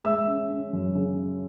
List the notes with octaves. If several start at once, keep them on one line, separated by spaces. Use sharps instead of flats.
G#3 E5 E6
C#4
C#4
F#2
C#3